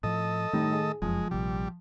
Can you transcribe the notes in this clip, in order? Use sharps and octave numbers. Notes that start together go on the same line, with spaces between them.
A2 F3 A4 D#5
A2 D#3 G3 A3 D#4
G#4
F1 F#2 F3 G#3
A#1 C3 G3